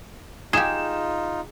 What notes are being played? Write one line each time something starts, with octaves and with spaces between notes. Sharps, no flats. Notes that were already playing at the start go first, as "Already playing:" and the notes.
D#4 F4 G4 G#4 E7